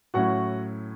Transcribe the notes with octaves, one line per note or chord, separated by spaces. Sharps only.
A2 F#3 C#4 E4 F#4 F#5